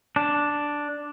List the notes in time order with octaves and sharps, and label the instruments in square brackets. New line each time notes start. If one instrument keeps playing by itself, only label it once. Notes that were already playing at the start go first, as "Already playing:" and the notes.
[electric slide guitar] D4